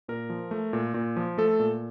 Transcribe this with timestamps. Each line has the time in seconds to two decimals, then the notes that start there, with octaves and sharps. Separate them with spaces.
0.08 A#2 A#4
0.30 F3
0.51 A3
0.73 A#2
0.94 A#2
1.17 F3
1.38 A3 A4
1.59 A#2